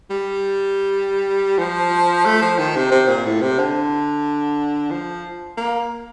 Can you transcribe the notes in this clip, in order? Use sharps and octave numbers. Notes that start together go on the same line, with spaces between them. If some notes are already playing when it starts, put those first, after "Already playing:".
G3
F3
A3
F3
D#3
C3
C3
A#2
A2
C3
D3
F3
A#3